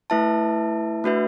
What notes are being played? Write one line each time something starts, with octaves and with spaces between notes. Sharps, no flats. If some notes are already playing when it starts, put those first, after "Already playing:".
A3 E4 B4 E5 A5
A3 D4 F#4 B4 E5